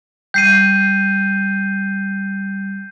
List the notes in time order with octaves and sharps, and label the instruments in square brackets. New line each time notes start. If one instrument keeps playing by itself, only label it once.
[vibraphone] G3 [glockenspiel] G6 C7 D#7